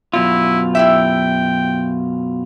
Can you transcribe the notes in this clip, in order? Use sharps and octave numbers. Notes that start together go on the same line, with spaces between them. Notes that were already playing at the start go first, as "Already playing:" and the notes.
F#2 B2 E4 F4
E4 G4 E5 G5